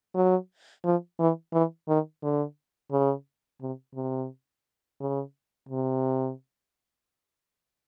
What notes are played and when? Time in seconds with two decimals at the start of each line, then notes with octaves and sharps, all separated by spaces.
0.15 F#3
0.85 F3
1.20 E3
1.53 E3
1.89 D#3
2.22 D3
2.92 C#3
3.62 C3
3.96 C3
5.01 C#3
5.69 C3